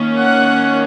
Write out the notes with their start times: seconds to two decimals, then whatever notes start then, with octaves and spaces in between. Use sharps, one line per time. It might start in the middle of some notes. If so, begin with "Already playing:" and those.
Already playing: D#3 A#3 C#4
0.20 F#5